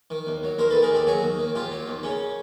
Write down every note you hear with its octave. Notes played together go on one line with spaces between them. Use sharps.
D#3
D#2
F#3
D#2 A#4 C5
D#3 A4 B4
G#4 A#4
D#2 G4 A4
F#3 F#4 G#4
D#2
D#3
D#2 F4 G4
F#3
D#2
C#3 C#4